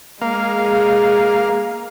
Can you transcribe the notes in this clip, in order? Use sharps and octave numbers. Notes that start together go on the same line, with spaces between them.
G#3 A#3 G#4 F5